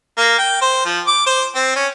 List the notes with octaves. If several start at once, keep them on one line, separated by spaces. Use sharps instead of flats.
A#3
G5
C5
F3
D6
C5
C4
C#4